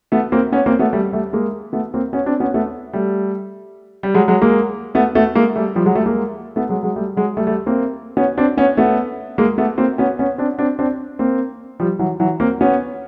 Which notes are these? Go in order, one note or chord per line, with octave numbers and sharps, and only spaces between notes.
A3 B3
A#3 C4
B3 C#4
A#3 C4
A3 B3
G3 A3
G3 A3
G#3 A#3
A3 B3
A#3 C4
B3 C#4
C4 D4
B3 C#4
A3 B3
G3 A3
G3
F#3 G#3
F#3 G#3
G#3 A#3
A3 B3
A3 B3
G#3 A#3
G3 A3
F3 G3
F#3 G#3
G3 A3
G#3 A#3
A3 B3
F#3 G#3
F#3 G#3
G3 A3
F#3 G#3
G3 A3
G3 A3
A#3 C4
B3 C#4
C4 D4
B3 C#4
A3 B3
G#3 A#3
A3 B3
A#3 C4
B3 C#4
B3 C#4
C4 D4
C4 D4
C4 D4
A#3 C4
F3 G3
E3 F#3
E3 F#3
A#3 C4
B3 C#4